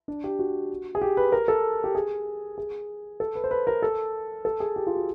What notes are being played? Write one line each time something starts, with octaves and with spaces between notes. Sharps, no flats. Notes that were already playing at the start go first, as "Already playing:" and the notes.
D4
G4
F#4
G#4
G4
B4
A#4
A4
G4
G#4
G#4
A4
B4
C5
B4
A#4
A4
A4
G#4
G4
F4
F#4